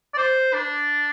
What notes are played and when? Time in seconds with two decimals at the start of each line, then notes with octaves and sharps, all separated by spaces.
0.14 D5
0.18 C5
0.53 D4